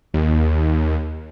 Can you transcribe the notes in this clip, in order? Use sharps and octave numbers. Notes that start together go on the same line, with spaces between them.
D#2